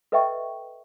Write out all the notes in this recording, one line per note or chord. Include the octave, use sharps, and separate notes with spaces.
A4 B4 D#5 E5 G5 C#6